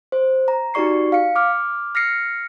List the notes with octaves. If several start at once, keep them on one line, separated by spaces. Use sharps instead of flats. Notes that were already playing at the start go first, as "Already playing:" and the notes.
C5
A#5
D#4 F#4 G4 D5 C#6 C7
F5 C#7
D6 F6
F6 A#6 C7 C#7